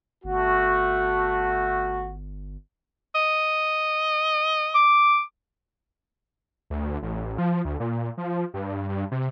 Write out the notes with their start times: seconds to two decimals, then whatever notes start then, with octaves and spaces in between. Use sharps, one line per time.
0.24 G1 A3 F#4
3.15 D#5
4.74 D6
6.70 D2
7.02 A1
7.38 F3
7.65 D2
7.80 A#2
8.18 F3
8.54 G2
8.89 G2
9.11 C3